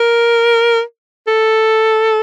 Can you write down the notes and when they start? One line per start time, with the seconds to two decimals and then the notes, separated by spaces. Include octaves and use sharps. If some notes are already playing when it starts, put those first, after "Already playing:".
Already playing: A#4
1.27 A4